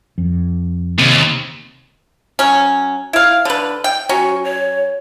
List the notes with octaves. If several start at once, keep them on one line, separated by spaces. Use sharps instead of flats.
F2
D#2 C3
F#3 C#4
E4 F5
D3 B4
G5
F#3 C#4 F#4
C#5